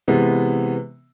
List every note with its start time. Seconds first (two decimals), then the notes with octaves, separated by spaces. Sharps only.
0.08 C3 E3 G#3 B3